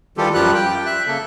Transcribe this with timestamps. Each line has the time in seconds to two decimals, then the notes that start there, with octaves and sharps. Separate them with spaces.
0.18 D#3 E3 G3 F4 G4 A4
0.34 F#2 F3 G3 F4 G4 F#6
0.54 G5
0.86 E5 F#6
1.07 C#3 A#3 A4